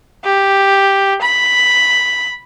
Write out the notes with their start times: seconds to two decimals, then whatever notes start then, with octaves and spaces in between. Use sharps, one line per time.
0.25 G4
1.22 B5